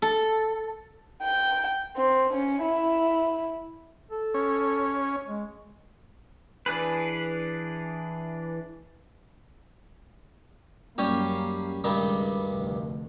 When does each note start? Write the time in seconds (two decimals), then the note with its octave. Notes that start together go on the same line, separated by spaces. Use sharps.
0.02 A4
1.23 G5
1.96 C4
2.33 C#4
2.63 E4
4.11 A4
4.34 C#4
5.28 G#3
6.66 E3 D4 G#4 B4
10.98 F#2 G3 A#3 C#4 G4
11.84 C#2 G2 D#3 G3
12.46 F1 D2